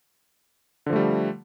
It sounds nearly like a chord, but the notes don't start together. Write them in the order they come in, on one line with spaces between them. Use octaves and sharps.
D3 F3 A3 G3